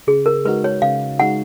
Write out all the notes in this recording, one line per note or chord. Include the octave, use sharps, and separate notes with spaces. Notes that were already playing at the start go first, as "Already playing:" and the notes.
C#3 G#4
A#4
G#3 D#4 F#4 B4
C#5
C#3 F5
G#3 D#4 F#4 F#5